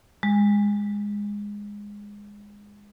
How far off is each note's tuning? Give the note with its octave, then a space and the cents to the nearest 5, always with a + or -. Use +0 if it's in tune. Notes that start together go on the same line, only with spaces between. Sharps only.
G#3 -15